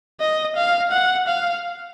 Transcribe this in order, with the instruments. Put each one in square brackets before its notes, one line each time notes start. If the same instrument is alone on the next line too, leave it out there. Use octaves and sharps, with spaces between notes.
[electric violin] D#5
F5
F#5
F5